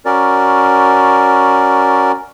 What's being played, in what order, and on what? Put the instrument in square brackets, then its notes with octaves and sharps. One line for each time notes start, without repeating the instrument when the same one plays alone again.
[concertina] C#4 F#4 A#4 D5